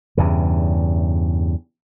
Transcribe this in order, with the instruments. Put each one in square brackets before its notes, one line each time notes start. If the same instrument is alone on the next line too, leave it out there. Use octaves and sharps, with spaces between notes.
[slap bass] E2 G2 C#3